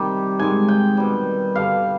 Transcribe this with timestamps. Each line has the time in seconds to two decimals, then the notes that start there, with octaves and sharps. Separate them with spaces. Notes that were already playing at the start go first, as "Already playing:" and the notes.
Already playing: C3 D#3 G3 G4
0.39 G#2 D#3 G#3 G#5
0.68 G5
0.97 B2 G3
1.55 G2 D3 G3 F5